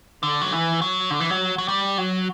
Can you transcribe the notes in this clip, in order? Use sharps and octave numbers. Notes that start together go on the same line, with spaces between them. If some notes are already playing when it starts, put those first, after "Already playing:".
D3
F#3
E3
F#3
D3
E3
F#3
F#3
G3
F#3